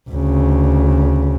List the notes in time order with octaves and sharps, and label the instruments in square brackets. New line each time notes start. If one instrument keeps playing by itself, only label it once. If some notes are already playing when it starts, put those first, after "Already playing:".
[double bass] D2 C#3